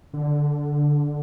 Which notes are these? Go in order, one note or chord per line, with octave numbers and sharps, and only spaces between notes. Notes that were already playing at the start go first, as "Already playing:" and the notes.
D3